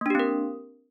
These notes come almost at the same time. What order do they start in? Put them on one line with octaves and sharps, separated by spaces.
A#3 D4 G4 C4 A#4